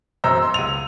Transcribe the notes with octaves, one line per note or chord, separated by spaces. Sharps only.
E1 F#2 C5 D#5 A#5 E6
C6 E6
C#2 D#7 F7